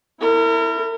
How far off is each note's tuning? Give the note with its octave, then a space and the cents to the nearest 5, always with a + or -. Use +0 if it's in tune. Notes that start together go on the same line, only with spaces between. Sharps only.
E4 +0 A#4 -35